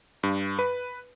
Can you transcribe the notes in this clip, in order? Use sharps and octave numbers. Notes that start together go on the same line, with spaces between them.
G2
B4